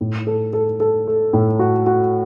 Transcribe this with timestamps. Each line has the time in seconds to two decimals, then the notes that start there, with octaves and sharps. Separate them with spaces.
0.01 A2
0.27 A4
0.53 A4
0.80 A4
1.07 A3
1.33 A2
1.59 F#4
1.86 F#4